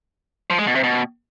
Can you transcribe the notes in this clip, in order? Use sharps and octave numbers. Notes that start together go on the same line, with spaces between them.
F3
G#3
B2
C3
B2